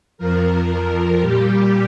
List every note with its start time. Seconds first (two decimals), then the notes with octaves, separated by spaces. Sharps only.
0.18 F2 F3 A#4
1.20 A#2 G3 G4